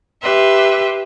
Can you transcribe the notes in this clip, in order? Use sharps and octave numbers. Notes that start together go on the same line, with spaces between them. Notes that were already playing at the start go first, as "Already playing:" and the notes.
G4 B4 E5 C6